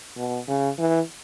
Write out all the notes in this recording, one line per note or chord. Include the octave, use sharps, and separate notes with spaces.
B2
C#3
E3